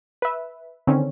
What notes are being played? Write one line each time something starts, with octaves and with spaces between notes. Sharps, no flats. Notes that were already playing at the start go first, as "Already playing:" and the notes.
B4 E5
D3 D#3 C4 C#4